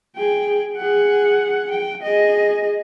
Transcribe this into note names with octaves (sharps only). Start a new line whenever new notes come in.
G#4 G5
G#4 F#5
G5
G#4 D#5